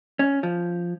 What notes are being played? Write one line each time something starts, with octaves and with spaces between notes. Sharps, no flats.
C#4
F3